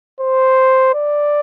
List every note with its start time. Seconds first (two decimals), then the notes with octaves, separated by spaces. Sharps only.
0.20 C5
0.94 D5